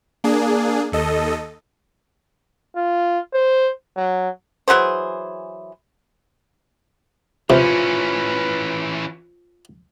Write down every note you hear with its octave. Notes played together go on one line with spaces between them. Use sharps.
A#3 D4 G#4
D#2 A4 D#5
F4
C5
F#3
E3 F#3 G#4 C5
C3 E3 C#4 F4 B4 C5